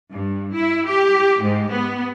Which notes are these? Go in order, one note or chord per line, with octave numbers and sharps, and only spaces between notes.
G2
E4
G4
G#2
B3